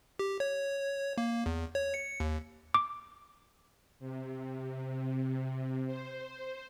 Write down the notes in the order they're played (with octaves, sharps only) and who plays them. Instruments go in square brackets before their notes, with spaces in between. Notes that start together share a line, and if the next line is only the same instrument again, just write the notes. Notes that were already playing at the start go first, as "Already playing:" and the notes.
[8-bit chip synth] G4
C#5
A#3
E2
C#5
C#7
D#2
[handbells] D6
[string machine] C3
C5